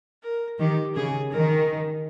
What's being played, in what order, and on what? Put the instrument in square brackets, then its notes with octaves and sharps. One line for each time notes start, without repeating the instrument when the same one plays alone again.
[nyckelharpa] A#4
[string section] D#3 [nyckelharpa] G4
[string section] C#3 [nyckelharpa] G#4
[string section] D#3 [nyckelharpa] A#4